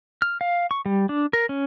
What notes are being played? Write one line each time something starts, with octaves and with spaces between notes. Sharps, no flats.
F6
F5
C#6
G3
D4
A#4
C#4